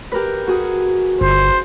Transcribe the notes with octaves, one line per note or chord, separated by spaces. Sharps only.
G4 A#4 B4
F#4 G#4
G1 C5